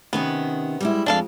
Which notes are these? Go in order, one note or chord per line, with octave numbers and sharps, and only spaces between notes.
C3 D#3 B3 C#4
G3 G#3 E4
F2 G#3 D4 A4 F5